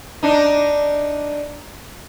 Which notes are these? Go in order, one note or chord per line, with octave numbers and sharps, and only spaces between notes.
D4 D#4